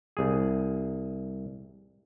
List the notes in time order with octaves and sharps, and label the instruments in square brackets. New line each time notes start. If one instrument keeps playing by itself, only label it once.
[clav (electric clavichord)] C2 G#4